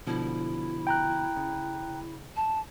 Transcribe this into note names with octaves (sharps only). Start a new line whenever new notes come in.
B2 D3 F3 E4
G5 A#5 F#6
C#3
A5